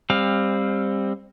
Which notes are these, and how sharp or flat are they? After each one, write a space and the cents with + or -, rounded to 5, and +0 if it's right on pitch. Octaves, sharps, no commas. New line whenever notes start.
G3 +25 C4 +15 F5 +0